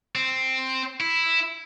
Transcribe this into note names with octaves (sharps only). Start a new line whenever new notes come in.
C4
E4